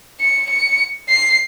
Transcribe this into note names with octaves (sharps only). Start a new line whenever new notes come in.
C#7
C#7
C7